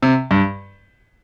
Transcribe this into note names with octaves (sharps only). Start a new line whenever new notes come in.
C3
G2